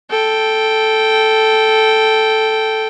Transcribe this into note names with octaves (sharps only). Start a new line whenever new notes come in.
A4 G5